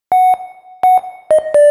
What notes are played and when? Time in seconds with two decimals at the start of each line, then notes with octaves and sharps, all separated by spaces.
0.12 F#5
0.83 F#5
1.31 D#5
1.54 D5